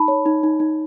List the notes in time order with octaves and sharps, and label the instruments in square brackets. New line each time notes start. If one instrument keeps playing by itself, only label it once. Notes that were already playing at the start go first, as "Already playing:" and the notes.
Already playing: [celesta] D#4 A5 B5
C#5
D#4
D#4
D#4